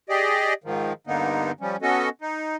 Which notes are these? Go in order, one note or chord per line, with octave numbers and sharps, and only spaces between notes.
G4 G#4 D5 D#5
G#2 D#3 F3
G2 D3 A#3 B3 D#4
F3 G3 C#4
B3 C#4 F#4 A4 D#5
D#4